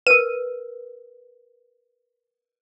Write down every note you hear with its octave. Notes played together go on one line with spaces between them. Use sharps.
A#4 B4 D#7